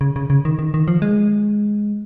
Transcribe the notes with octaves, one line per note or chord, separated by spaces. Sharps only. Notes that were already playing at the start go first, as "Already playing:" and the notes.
C#3
C#3
C#3
D#3
D#3
D#3
F3
G#3